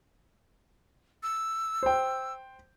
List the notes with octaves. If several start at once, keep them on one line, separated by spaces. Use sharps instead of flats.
E6
C5 G5